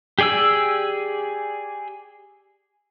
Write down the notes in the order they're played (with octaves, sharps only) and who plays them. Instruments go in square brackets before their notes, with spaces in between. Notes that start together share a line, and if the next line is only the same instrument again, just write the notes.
[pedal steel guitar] G4 G#4 D5 G#5 E6